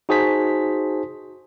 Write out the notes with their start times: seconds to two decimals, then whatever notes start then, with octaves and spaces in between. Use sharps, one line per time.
0.09 D#4 F#4 G#4 C5 A5 B6